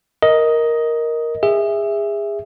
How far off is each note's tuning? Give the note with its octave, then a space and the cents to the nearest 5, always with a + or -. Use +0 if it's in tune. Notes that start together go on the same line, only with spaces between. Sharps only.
A#4 +0 D#5 +10
G#4 -25 E5 +0